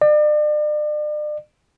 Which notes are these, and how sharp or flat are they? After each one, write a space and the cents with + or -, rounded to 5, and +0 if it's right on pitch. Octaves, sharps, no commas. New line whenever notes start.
D5 +40